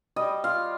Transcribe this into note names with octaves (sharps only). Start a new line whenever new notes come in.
G3 D#5
F4 F5